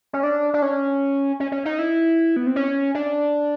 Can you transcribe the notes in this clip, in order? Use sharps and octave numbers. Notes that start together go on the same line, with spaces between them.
C#4
D4
D4
C#4
C#4
C#4
D#4
E4
B3
C4
C#4
D4